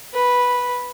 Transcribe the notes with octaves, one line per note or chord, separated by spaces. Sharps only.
B4